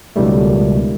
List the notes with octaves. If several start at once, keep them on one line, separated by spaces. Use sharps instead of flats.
C#2 B2 D#3 G3 A3